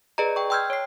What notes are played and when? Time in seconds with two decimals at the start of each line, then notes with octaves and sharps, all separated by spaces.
0.18 G#4 B4 D5 D#5 A#5
0.36 G5 C#6
0.50 G5 C6 E6 F6 G6 G#6
0.70 C#5 C7